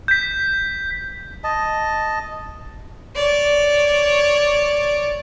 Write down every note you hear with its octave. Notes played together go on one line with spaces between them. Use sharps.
G6 B6
D#5 A5
C#5 D5